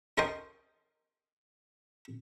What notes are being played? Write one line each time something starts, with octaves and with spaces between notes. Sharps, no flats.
C#4 A4 A#4 C5 D#5 G5